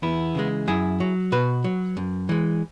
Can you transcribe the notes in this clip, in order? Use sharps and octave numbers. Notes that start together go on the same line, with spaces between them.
E2 B3 E4
C#3 E3 G#3
F#2 E4 G#4
F#3
B2 F#4 B4
F#3
F#2
E3 G#3